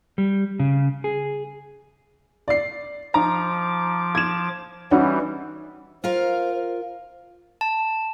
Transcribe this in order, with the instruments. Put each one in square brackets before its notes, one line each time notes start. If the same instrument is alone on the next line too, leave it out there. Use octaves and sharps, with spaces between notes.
[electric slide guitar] G3
C#3
G#4
[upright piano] D5 C7
[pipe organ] F3 D6 [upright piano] D#4 A#5
[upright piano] G#6 E7
[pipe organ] E3 G3 [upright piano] C#4 D#4 F#4
[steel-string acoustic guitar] F4 A#4 F5 [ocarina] C5
[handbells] A5